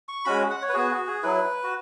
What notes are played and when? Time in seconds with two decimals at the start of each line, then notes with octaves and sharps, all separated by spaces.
0.09 C#6
0.25 G#3 C#4 F#4 B5
0.50 F#5
0.62 C#5
0.69 B4
0.74 B3 F#4 G#4
0.91 F#4
1.07 G#4
1.23 F#3 E4 B4
1.64 F#4